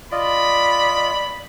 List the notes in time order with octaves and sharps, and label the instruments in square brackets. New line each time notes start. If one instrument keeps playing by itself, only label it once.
[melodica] F4 D#5 [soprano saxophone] D5 [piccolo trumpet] B5